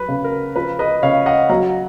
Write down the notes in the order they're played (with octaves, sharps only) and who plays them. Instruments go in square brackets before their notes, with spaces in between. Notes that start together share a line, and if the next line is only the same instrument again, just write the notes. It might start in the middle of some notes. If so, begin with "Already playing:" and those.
Already playing: [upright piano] F#3 [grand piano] B4
[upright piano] C#3
[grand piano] A#4
[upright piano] F3 [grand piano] B4
[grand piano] B4 D#5
[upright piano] C#3 [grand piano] C#5 F5
[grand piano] D#5 F#5
[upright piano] F#3 [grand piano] F#5 A#5